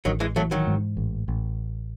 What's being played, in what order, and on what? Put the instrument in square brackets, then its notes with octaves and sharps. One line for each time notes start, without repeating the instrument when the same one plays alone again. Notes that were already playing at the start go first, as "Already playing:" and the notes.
[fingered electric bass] A1 [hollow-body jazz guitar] D#3 F#3
[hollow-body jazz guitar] E3 G#3
[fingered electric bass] E3 [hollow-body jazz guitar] F#3 A3
[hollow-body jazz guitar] D#3 F#3
[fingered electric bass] G#2
A1
A1